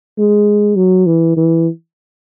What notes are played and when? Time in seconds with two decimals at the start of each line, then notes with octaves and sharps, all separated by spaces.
0.18 G#3
0.77 F#3
1.07 E3
1.37 E3